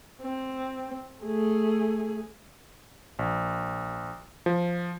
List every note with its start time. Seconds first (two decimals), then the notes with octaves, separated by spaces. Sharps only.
0.22 C4
1.23 A3 G#4
3.19 A#1
4.46 F3